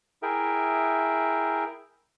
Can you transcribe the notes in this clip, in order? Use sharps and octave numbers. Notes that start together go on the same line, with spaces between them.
E4 G#4 A#4 E5 G5